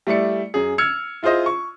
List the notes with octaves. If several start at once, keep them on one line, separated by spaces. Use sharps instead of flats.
G3 A3 E4 D5 C#7
F#2 G#4
E6 F6 G#6 C#7
E4 F4 G#4 C5 D#5
C#6